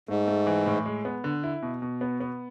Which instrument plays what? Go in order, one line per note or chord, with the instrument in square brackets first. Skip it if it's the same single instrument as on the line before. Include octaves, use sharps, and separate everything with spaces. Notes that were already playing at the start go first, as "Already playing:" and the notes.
[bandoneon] G#2 [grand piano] A3
[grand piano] A3
E3
A2
G#3
B3
D3
E4
B2
B2
B3
B3